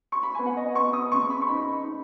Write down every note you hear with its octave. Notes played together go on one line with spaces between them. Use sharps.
C#6
B5
B3 G#5
F#5
D#5
B3 C#6
D#6
C#3 C#6
B5
C#6
D#4 B5
D#4